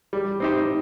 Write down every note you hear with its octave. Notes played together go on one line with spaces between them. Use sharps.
G3
C4 D#4 G4 C5